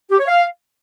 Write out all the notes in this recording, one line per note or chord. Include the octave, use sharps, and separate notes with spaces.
G4
C#5
F5